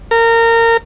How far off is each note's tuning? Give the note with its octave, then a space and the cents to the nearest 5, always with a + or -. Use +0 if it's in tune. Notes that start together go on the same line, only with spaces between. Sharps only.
A#4 -25